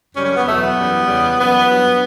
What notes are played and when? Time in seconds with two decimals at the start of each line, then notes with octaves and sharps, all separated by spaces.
0.15 F#2 C#3 G3 C#4
0.25 C#4
0.36 B3
0.45 E2 B2 F#3 A3
0.61 B3
0.76 F#2 E3 G3
1.07 E2 C#3 G3
1.38 F#2 E3 G3 B3
1.68 G2 F#3